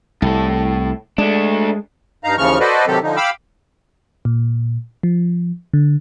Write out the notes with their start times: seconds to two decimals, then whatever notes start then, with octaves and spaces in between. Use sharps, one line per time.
0.22 C2 A2 A4
1.18 G#3 A3 D4
2.24 G2 D#4 F5 A#5
2.38 D#2 C#3 E3 F3 C#6 F6
2.60 F#4 A4 B4 C5 D5 D#5
2.87 C3 D#3 F#3 C4 G4 A4
3.03 D3 F3 D#4
3.16 F5 G5 B5 D6 E6
4.25 A#2
5.03 F3
5.73 D3